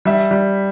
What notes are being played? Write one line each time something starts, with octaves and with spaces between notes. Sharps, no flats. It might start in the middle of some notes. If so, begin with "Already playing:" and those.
G3 E5
G3